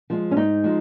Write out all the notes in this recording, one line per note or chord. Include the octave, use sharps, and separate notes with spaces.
F3 G#3
C#4
G#2 D#4
F3 G#3